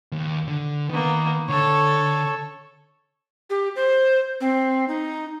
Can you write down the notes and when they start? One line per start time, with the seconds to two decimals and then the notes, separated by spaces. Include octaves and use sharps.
0.12 D#2
0.48 D3
0.90 D#3 A#3 B3
1.49 D3 A4 C#5
3.50 G4
3.76 C5
4.41 C4
4.88 D#4